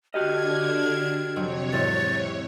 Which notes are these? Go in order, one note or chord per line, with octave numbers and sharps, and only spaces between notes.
D3 D4 F#4 G4 D#5 F6 G#6
F2 C3 F#3 C#5 D7
E2 G#2 A6